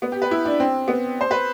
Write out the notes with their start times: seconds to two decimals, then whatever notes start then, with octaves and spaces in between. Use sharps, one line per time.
0.02 B3
0.12 G4
0.22 B4
0.31 E4
0.45 D4
0.60 C4
0.88 B3
1.21 C5
1.31 B4